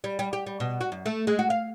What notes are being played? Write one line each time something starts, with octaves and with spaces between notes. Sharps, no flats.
G3
G3
G4
G3
B2
F#4
F#2
A3
G#3
F#4
F5